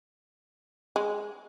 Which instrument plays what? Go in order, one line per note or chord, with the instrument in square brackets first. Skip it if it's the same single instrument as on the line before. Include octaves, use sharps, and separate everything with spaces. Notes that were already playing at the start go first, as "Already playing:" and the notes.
[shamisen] G#3